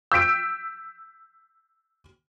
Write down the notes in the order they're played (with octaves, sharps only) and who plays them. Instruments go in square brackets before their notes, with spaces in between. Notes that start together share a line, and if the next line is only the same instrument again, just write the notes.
[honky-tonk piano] E6 G6 B6 D7